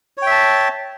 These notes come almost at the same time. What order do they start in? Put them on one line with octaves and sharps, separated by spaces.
C#5 G5 E5 A5